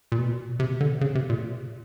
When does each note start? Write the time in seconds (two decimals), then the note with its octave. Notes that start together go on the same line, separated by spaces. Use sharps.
0.12 A#2
0.18 B2
0.60 C3
0.81 D3
1.01 C#3
1.15 C3
1.30 A#2